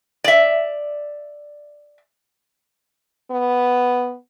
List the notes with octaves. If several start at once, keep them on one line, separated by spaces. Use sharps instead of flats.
D5 E5
B3